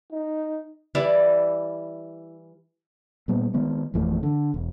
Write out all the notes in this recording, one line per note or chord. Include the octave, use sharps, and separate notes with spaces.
D#4
E3 G3 E4 D5
A#2 G3 B3
D#3 G#3 B3
G#1 F2 E3 A3
D3
E1